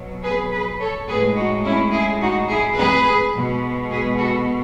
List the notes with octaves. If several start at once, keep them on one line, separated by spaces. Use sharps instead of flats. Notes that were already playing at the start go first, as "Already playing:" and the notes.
Already playing: B2 F#3
G#4 B4
G#4 B4
A4 C#5
A2 G#3 G#4 B4
D#4 F#4
C#4 E4
E4 G#4
D#4 F#4
E4 G#4
G#4 B4
B2 G#3
G#4 B4
F#4 A4